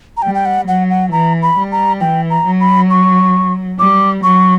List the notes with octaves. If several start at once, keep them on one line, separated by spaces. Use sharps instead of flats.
A#5
G3 G5
G5
F#5
F#3 F#5
F#5
E3 A#5
B5
G3
A#5
E3 G5
A#5
F#3
B5
C#6
G3 D6
F#3 C#6